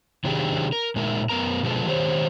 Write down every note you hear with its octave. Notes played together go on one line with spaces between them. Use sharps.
C3 D#3 F#3 D4 G4 G#4
A#4
A#2 G#3 D#4 A#4 E5
F#2 B3 A#4 A#5
B2 D3 F3 G#3 A4 B4
D#3 G4 C5 C#5